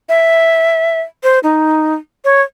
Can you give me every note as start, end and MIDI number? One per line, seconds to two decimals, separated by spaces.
0.09 1.00 76
1.23 1.39 72
1.43 1.94 63
2.25 2.42 73